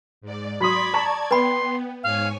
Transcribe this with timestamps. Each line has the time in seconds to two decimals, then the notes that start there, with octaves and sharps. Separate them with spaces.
0.21 G#2 D5
0.61 F#3 D5 B5 C6 D#6 G#6
0.94 A5 A#5 C#6
1.31 B3 B4 G5 B5 C6
2.03 G#2 C#5 F5 G#5